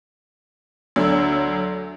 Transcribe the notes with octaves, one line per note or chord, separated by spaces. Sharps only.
D2 F#3 D4 E6